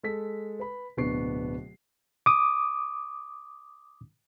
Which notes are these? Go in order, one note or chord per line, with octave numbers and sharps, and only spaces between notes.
G#3 A4 B6
B4 B5
D1 B2 B3 D4 C#6 C7
D6 D#6